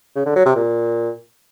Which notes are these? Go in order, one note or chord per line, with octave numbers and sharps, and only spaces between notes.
C#3
D3
F#3
C3
A#2